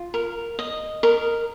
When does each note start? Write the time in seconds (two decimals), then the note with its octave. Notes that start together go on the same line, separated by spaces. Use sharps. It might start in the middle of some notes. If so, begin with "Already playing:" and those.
Already playing: F4
0.14 A#4
0.59 D#5
1.03 A#4